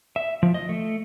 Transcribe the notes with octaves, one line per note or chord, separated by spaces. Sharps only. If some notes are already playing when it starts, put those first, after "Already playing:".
E5
F3
D#5
A3